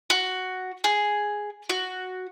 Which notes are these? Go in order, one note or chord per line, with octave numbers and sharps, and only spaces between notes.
F#4
G#4
F#4